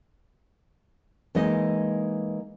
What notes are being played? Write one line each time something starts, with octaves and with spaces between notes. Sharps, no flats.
E3 G#3 A#3 D#4 D#5